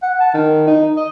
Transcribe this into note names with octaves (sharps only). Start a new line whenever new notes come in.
F#5
A5
D#3
D#4
D#5